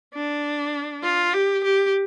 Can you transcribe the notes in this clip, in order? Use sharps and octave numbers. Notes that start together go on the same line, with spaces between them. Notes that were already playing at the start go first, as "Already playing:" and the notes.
D4
F4
G4
G4